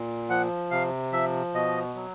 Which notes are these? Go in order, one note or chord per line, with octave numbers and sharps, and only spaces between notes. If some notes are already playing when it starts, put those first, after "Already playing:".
Already playing: A#2
F3 F#5
C3 F5
F3 E5
B2 D#5
F#3